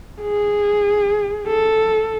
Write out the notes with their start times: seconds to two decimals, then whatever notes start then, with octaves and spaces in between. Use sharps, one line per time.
0.22 G#4
1.47 A4